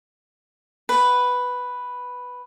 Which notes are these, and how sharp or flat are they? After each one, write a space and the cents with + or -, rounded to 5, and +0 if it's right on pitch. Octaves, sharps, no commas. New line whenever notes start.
B4 +0 F#5 +0